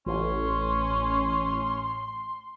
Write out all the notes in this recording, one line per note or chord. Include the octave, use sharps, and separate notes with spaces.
A1 C#4 C6